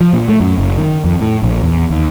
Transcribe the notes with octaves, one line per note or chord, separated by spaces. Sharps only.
F3
A#2
A3
F#2
F#1
D#3
F2
A2
A#1
E2
D#2